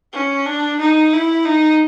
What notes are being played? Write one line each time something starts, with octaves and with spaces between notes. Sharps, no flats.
C#4
D4
D#4
E4
D#4